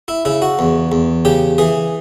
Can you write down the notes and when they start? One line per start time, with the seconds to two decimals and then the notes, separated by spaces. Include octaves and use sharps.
0.08 E4
0.25 C#3 E4
0.42 F#4
0.59 E2
0.92 E2
1.25 C#3 G4
1.58 E3 G#4